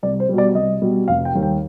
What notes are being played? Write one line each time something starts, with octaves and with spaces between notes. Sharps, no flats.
C2 D5
C5
B2 G3
D5
C2 D#5
B2 G3
F1 F5
G5
D#2 D#3 G3
G5